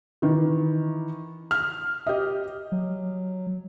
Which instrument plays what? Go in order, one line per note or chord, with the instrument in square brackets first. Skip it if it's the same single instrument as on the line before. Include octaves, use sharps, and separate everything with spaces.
[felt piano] D#3 E3
F6
G4 D#5
[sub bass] F#3